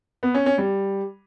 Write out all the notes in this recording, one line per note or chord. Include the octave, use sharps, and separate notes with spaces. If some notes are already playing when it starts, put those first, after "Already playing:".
B3
C#4
C#4
G3